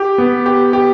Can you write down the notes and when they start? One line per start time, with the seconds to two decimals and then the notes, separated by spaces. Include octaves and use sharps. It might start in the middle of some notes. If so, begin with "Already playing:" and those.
Already playing: G4
0.18 B3
0.46 G4
0.73 G4